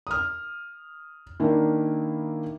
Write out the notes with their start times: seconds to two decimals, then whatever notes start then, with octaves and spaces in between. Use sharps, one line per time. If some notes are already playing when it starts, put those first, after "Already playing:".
0.07 D#6 F6
1.40 D#3 A#3 D4 E4